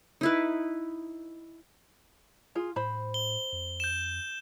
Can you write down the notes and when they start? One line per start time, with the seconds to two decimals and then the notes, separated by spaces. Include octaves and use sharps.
0.21 D#4 E4 B4
2.55 F4 G#4
2.76 A2 C5 B5
3.14 G7
3.52 F2
3.80 G6 E7